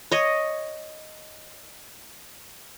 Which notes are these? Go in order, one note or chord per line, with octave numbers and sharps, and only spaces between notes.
C#5 D#5